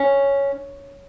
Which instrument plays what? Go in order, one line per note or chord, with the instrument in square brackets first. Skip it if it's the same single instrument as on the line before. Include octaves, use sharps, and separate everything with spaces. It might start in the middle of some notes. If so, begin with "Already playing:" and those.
Already playing: [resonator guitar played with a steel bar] C#4